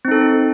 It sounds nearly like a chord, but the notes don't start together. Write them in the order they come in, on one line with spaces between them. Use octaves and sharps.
C4 D#4 A4